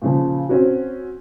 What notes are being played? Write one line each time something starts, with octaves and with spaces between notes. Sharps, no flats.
A#2 C#3 F3
C4 C#4 F#4